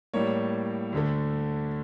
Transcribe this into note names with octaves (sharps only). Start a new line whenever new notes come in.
A2 G3 A#3 C#5
D2 D3 A3